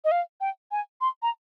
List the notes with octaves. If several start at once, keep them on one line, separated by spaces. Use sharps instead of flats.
D#5
F5
G5
G#5
C6
A#5